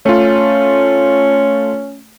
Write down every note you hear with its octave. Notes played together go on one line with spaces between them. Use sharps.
A3 C#4 F4